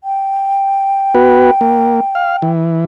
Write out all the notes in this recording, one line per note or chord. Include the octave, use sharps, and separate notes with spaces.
G5
B3 F#4 B4
A#3
F5
E3